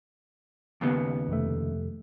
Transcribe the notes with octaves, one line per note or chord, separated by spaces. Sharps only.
D#2 C#3 B3
F2 C3 A3